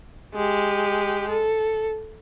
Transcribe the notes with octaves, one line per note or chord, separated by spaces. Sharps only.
G#3 G4
A4